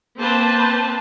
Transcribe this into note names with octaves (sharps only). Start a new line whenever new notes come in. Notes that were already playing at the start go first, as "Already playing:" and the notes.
A#3 C4 B4 C5 A5